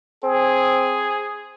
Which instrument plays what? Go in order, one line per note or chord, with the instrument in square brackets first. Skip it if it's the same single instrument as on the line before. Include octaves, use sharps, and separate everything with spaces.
[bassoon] C4 [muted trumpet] G#4